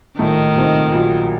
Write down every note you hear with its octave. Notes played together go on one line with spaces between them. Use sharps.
A#1 A2 D#3 A3 D#4
C2 A#2 A3 C4 D#4
A#1 A#2 F#3